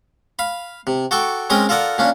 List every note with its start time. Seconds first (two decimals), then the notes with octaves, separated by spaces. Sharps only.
0.39 F5 B5
0.87 C3
1.11 F#4 A4 G5 C#6 D6
1.50 G#3 C4 C#4 A#4 G5 D#6
1.69 F4 A4 A#4 D5 F#5
1.98 A#2 A#3 C#4 D4